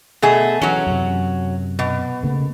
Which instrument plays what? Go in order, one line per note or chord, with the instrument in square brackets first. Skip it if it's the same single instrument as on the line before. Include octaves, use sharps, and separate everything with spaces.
[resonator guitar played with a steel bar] B2 A3 G#4
[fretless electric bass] E3 [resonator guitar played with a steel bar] F#3 C#4
[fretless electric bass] F#2 C3
[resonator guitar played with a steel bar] B2
[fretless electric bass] C#3 A3 A#3